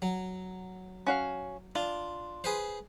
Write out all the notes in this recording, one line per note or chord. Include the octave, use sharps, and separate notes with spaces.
F#3
C#4 F#4 F5
D4 F4
G#4 B4 C5